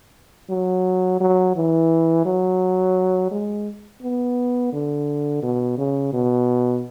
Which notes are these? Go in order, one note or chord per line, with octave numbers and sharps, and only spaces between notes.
F#3
F#3
E3
F#3
G#3
B3
D3
B2
C#3
B2